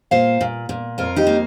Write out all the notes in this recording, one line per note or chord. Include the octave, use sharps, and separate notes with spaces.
A#2 C5 F5
A#2
A#2
F2 F4 A#4
D#4 G4
A#3